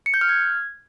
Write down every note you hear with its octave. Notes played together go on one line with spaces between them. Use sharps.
C#7
G6
F6
G#6